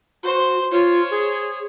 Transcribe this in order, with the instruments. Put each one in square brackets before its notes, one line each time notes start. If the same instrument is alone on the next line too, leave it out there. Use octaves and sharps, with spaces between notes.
[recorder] F#4 [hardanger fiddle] C5
[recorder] F4 [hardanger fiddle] C5 C#5
[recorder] G#4